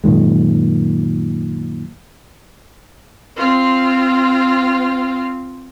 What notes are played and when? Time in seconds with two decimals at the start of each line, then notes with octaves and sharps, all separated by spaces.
0.04 F#2 A#2 D#3 G#3
3.36 C4 F4